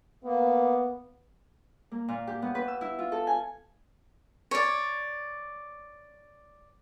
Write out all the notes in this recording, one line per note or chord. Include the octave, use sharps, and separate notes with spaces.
A#3 B3
A#3
A#2
G4
B3
B4
E6
E4
F4
A4
G#5
C#5 D5